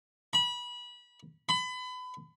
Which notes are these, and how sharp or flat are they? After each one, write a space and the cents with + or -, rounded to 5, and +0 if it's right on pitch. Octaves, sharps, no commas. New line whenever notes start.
B5 -25
B5 +30